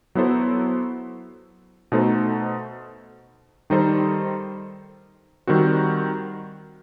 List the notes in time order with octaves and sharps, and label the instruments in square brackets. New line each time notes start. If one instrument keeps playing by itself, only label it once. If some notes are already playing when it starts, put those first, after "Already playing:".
[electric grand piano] F#3 B3 E4 A4 C5
B2 A3 D#4 A4 C5
D#3 G3 D#4 A4 C5
D#3 G3 C4 F#4